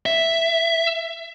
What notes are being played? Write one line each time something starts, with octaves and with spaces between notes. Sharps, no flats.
E5